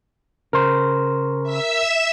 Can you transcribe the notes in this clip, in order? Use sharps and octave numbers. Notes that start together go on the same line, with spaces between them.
C#3 A#4 C5
E5 E6